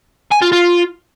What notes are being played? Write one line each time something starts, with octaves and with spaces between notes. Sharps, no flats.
G#5
F4
F4